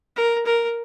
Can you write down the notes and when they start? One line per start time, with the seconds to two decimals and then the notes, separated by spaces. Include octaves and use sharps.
0.16 A#4
0.45 A#4